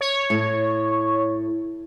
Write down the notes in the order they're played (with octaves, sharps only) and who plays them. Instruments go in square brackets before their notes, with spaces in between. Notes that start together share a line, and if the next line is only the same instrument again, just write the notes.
[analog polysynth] C#5
[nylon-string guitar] A2